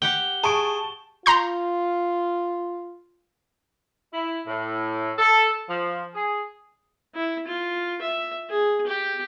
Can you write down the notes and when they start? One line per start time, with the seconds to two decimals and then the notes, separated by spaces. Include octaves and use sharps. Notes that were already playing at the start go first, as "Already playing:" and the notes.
0.02 G4 F#5 G5 G7
0.44 G#4 A5 C#6 D7
1.26 F4 A#5 C6 G6
4.14 E4
4.46 A2
5.19 A4
5.69 F3
6.15 G#4
7.15 E4
7.47 F4
8.02 E5
8.50 G#4
8.87 G4